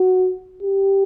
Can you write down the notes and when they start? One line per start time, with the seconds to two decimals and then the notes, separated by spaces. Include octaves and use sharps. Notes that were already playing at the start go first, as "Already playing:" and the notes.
Already playing: F#4
0.63 G4